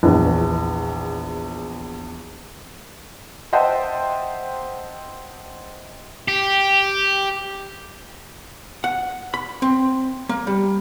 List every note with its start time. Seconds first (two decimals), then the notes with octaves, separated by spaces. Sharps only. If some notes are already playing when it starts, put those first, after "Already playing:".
0.03 A#1 E2
3.53 C5 D#5 E5 F#5 G5 A5
6.28 G4
8.84 F#5
9.34 B5
9.62 C4
10.29 A#3
10.47 G3